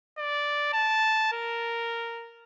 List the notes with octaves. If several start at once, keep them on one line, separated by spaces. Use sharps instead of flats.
D5
A5
A#4